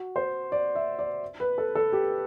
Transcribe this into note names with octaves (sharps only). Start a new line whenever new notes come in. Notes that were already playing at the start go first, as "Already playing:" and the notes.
Already playing: F#4
C5
D5
E5
D5
B4
A4
A4
G4